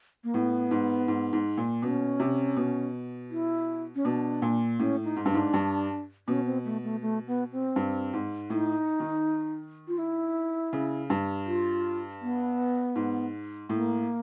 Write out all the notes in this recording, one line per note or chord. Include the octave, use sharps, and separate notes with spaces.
A#3
A2 B3
G#2
G#2
G#2
A#2
B2 C#4
C3
B2
E4
C#4
B2 D4
A#2
A2 C#4
D#4
G#2
G2 D4
G#2
G2
B2 C#4
C4
A3
A3
A3
B3
C4
G2
G#2
A2 D#4
D#3
F4
E4
C#3
G2
F4
B3
G#2
A2 A#3